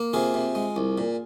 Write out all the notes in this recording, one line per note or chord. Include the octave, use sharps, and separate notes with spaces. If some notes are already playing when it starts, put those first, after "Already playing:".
Already playing: A#3
C3 F4 G#4
C3
G#3
C2
A#2